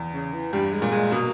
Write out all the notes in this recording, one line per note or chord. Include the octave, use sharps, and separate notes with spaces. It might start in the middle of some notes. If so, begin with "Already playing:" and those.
Already playing: E2
C#3
E3
G2 G3
G#3
A#2
G#3
B2 A#3